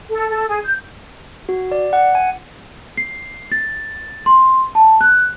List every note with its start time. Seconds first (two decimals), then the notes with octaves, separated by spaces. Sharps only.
0.10 A4
0.30 A4
0.48 G#4
0.64 G6
1.49 F#4
1.71 D5
1.93 F#5
2.15 G#5
2.97 C7
3.52 A6
4.26 C6
4.75 A5
5.01 F#6